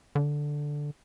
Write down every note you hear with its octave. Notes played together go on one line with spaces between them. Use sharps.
D3